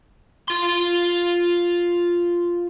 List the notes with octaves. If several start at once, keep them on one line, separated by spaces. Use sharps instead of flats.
F4 C6